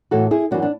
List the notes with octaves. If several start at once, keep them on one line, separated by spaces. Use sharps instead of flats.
A2 E3 F#4 A4
E4 G#4
F#2 E3 D4 F#4
D4